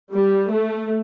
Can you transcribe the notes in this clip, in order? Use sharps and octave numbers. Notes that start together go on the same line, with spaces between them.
G3
A3